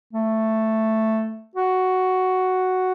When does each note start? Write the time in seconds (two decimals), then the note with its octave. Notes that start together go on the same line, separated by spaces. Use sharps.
0.13 A3
1.55 F#4